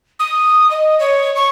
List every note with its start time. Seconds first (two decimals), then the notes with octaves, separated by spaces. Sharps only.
0.20 D#6
0.71 D#5
1.00 C#5
1.36 C#6